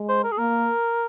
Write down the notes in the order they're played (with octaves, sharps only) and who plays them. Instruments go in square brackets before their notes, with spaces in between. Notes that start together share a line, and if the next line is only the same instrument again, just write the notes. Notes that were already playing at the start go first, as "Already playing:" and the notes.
Already playing: [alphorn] G#3
[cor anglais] C5
A#4
G#4
[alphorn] A#3 [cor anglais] A#4